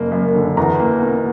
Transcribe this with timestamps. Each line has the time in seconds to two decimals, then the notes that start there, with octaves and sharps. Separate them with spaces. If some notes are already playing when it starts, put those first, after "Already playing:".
Already playing: F#1 A#3
0.12 F#2
0.35 D3
0.57 E2 A#5
0.80 A#3
1.02 B2